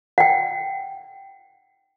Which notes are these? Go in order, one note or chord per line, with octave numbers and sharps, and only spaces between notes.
F#5 G5